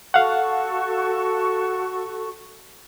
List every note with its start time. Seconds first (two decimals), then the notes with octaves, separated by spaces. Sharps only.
0.14 F#4 A4 F5 F#5 C#6